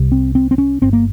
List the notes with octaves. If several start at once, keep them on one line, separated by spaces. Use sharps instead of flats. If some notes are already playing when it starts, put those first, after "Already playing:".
Already playing: C2 C3
C4
C4
C4
C#4
G1 G2 C4
A#3